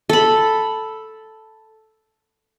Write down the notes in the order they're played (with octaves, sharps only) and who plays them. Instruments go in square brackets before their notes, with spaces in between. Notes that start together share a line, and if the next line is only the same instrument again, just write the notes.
[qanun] A4 B5